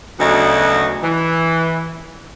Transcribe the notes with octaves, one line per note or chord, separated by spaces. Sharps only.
D2 C#3 F#3 B3 D4 D#4
E3